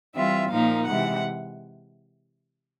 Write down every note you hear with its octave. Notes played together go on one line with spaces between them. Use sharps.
E3 G3 C4 F4 E5
A#2 F3 A#3 D#4 F5
C3 E3 G#3 F#5